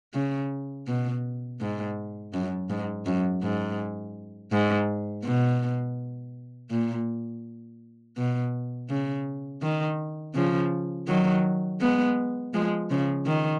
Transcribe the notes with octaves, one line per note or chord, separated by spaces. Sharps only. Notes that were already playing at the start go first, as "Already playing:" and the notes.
C#3
B2
G#2
F#2
G#2
F#2
G#2
G#2
B2
A#2
B2
C#3
D#3
C#3 F3
D#3 F#3
G#3 B3
F3 G#3
C#3 F3
D#3